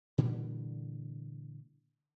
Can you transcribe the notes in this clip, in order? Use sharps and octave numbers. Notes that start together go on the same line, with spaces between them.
A#2 D3 E3 G3